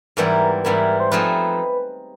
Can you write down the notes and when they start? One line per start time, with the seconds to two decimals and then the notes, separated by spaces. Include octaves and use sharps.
0.17 G#2 E3 G3 B3 E4 A#4
0.64 G#2 E3 G3 B3 E4 A#4
1.00 C5
1.12 F3 A3 C4 D#4 G#4 B4